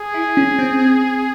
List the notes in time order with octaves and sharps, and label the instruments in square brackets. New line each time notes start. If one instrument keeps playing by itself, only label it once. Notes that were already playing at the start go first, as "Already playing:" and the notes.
Already playing: [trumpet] G#4
[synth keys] E4
C#4
C4